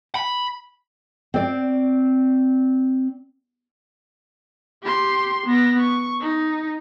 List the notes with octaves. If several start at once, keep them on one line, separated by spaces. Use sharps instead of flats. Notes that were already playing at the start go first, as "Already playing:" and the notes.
B5
C4 D5
G4 C6
B3 A#6
C#6
D#4